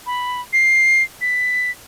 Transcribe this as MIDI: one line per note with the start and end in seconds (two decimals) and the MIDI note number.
0.06 0.41 83
0.53 1.03 96
1.21 1.71 95